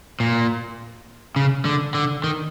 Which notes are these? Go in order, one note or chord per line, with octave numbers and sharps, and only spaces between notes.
A#2
C#3
D3
D3
D#3